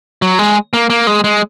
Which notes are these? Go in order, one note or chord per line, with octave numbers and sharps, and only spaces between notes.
F#3
G#3
A#3
A#3
G#3
G#3